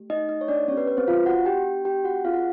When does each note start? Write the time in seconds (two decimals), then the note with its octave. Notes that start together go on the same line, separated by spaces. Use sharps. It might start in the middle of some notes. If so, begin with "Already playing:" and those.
Already playing: A3 G4
0.10 D#4 D#5
0.29 D#4 D#5
0.41 C#5
0.48 D4 D5
0.68 B3 C#4 D4 G4 C#5
0.77 B4
0.87 B4
0.97 C4 C5
1.08 F4 F5
1.26 F#4 F#5
1.46 G4 G5
1.85 G4 G5
2.04 F#4 F#5
2.24 C4 F4 G#4 F5
2.33 F#5